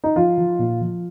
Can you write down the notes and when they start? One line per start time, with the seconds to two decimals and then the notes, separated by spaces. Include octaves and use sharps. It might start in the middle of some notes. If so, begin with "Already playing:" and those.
0.04 D#4
0.16 F3 F4
0.38 F3
0.59 A#2
0.81 F3